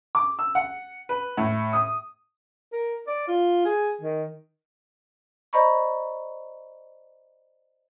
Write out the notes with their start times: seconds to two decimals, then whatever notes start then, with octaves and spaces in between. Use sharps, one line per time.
0.15 D6
0.39 E6
0.55 F#5
1.09 B4
1.37 A2
1.73 D#6
2.73 A#4
3.07 D5
3.28 F4
3.65 G#4
4.01 D#3
5.53 C5 D5 D#5 A#5 B5 C#6